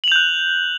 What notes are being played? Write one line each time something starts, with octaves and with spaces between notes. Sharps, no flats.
F#6 G6 F7 F#7